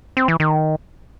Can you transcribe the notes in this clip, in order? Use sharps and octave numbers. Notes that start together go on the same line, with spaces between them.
C4
E3
D#3